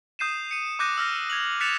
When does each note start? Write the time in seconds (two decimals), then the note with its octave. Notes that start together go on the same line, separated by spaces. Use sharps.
0.19 D#6 G6 C7 D#7 E7
0.51 C#7 D#7
0.79 D6 D#6 F#6 G6 A#6 D#7
0.97 E6 F6 A#6
1.30 G#6 F7 F#7
1.60 F#6 A6 B6 C#7 E7 F7